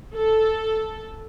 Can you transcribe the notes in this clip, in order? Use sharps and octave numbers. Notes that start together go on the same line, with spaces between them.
A4